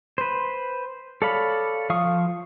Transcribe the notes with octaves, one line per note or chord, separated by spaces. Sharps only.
B4 C5
A4 C#5 D5 F5 B5
F3 F5 C#6 D#6